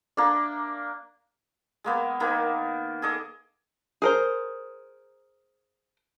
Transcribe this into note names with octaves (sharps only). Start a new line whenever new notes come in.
A#3 D4
G#3 A#3 B3
D#3 A#3 B3
G#4 A4 D#5 D6
G#4 A#4 C5